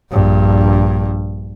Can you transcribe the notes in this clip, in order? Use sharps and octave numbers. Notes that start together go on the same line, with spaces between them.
A#1 G2